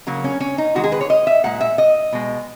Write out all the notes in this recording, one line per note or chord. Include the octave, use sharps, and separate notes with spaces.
C#3 F#3 A#3
C#4
C#4
D#4
D#3 G#3 F#4
G#4
B4
C#5
D#5
E5
A#2 G#3 F#5
E5
D#5
B2 G#3